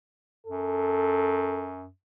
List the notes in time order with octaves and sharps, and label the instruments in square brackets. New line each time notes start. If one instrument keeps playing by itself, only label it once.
[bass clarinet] F#2 [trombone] A4